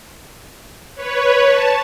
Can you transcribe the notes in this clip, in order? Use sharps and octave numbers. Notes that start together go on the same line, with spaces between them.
B4 C#5
A5